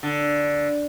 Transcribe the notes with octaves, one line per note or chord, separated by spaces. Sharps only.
D3